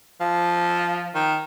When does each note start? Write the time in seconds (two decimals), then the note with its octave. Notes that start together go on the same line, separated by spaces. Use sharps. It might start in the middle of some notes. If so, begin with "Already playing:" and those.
0.20 F3
1.15 D#3